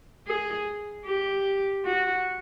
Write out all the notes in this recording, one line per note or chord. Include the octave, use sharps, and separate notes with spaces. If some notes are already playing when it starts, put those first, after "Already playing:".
G#4
G4
F#4